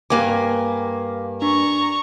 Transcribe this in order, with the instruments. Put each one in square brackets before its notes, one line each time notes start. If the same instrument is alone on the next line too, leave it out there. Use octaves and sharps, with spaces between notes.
[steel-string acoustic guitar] G2 A#3 G#5 [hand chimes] F5 D6
[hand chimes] D4 [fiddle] A#5 C#6